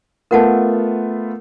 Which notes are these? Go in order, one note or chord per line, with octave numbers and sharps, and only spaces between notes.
A3 B3 F4 A#4 F#5 A5